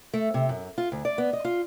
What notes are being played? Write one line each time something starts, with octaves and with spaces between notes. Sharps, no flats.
A3
C3
F#2
F4
D2
D5
B3
D#5
F4